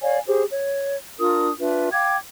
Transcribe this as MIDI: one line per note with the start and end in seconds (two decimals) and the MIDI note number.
0.02 0.20 73
0.02 0.20 74
0.02 0.20 77
0.02 0.20 80
0.27 0.44 67
0.27 0.44 68
0.27 0.44 72
0.51 0.97 73
1.19 1.49 62
1.19 1.49 65
1.19 1.49 70
1.19 1.49 87
1.59 1.90 62
1.59 1.90 65
1.59 1.90 71
1.59 1.90 76
1.92 2.17 77
1.92 2.17 79
1.92 2.17 86
1.92 2.17 92